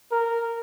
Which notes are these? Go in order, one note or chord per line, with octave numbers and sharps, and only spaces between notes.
A#4